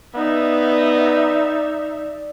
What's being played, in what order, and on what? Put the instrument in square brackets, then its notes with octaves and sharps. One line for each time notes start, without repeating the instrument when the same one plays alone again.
[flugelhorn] B3 [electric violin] D#4 E5 [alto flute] D5